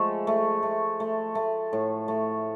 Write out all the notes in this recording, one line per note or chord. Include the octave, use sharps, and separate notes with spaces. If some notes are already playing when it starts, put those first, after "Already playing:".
Already playing: F3 G#3 A3
A3
A3
A3
A3
A2
A3